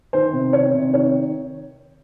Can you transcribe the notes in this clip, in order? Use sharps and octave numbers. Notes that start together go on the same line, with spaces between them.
D#3 C5
C3
D#3 C#5
C3
D#3 C#5